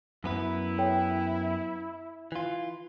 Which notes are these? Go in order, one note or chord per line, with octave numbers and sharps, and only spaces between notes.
F#2 B3 E4 B4
A4 C#5 G5
E3 F4